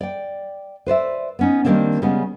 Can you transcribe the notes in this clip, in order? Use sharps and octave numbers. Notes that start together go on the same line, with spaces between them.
D5 G5
B4 C5 D5 E5
B3 C#4 D#4
D#3 G3 G#3 A#3 C4 D4
C#3 G3 G#3 B3 C#4